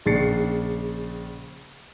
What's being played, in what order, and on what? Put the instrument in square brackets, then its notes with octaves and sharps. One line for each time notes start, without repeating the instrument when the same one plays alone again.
[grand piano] A#1 C#3 A6 C7 C#7